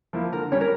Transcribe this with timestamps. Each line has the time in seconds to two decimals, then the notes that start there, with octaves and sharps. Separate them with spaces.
0.13 F3 A#3 E4
0.32 D3 A#4
0.52 G3 C#4 C#5
0.61 A#4